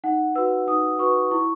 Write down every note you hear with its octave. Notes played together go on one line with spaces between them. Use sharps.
D#4 F#5
F#4 B4 E6
D#4 D#6
F#4 B4 C#6
E4 C#6